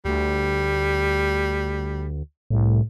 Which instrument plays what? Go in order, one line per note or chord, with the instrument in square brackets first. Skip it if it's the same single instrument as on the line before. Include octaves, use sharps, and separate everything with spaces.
[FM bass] D2 [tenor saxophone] G3
[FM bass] C2 [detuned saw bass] A2